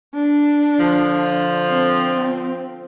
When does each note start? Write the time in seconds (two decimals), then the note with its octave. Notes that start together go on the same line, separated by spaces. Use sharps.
0.15 D4
0.79 D3 F3
1.69 C4